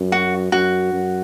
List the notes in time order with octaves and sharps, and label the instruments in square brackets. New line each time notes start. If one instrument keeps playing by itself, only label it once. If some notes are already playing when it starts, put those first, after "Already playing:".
Already playing: [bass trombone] F#2
[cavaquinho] F#4
[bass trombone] F#2 [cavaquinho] F#4
[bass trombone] F#2